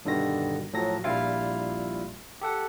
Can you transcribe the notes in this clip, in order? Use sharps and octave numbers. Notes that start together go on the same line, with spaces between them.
G2 B2 D3 D#3 G3 A#6
A2 F3 F#3 A#6
A#1 A#2 G3 E4 F4 F5
G4 A4 F#5